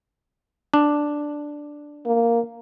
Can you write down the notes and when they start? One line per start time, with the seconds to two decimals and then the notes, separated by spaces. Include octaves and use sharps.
0.74 D4
2.06 A#3